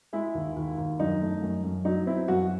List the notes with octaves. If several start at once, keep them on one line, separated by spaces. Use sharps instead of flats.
G#3 E4
D#2
D#2
D#2
F#2 D#4
A3
F#2
F#2
F#3 D#4
C4 E4
F#2 F#4